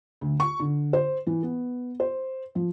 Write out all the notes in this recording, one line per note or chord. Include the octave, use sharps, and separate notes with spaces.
D2
C#6
D3
C5
E3
B3
C5
F3